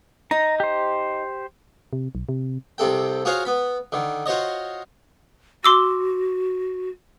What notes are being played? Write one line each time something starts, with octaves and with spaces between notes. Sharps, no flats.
D#4 A#5
G4 C5
C3
B1
C3
C2 C3 A4 G5
F4 F#4 G#4 C5 C#5 F5
B3 B5
D3 D#3
F4 F#4 C5 C#5 D#5
F#4 C6 D6 E6